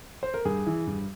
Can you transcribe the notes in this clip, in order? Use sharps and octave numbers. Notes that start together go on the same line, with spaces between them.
C5
A#4
G2 G#4
E3
G2